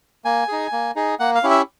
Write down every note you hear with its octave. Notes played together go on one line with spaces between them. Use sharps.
A#3 G#5
D#4 G#4
A#3
D#4 G#4
A#3 F#5
F5
C#4 E4 G4
E5